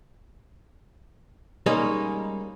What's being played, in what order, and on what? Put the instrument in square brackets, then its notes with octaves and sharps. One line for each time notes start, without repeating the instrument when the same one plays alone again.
[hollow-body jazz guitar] G3 G#3 A#3 C#4 D#4 G#4